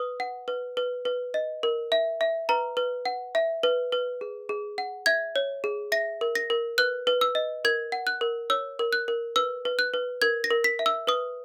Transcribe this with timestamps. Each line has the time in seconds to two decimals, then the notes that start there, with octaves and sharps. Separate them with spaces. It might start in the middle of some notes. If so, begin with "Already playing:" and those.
Already playing: B4 D#6
0.20 F#5
0.48 B4
0.77 B4
1.05 B4
1.34 D#5
1.63 A#4
1.92 E5
2.21 E5
2.49 B4 A#5
2.77 B4
3.05 F#5
3.35 E5
3.63 B4
3.92 B4
4.21 G#4
4.49 G#4
4.78 F#5
5.06 E5 G#6
5.36 C#5
5.64 G#4
5.92 E5 A#6
6.21 A#4
6.35 A#6
6.50 A#4
6.78 B4 F#6
7.07 B4
7.21 E6
7.35 D#5
7.65 A#4 G#6
7.92 F#5
8.07 F#6
8.21 A#4
8.50 C#5 E6
8.79 A#4
8.93 F#6
9.08 A#4
9.36 B4 E6
9.65 B4
9.79 F#6
9.94 B4
10.22 A#4 G#6
10.44 A#6
10.51 A#4
10.64 B6
10.79 E5
10.86 E6
11.07 B4 D#6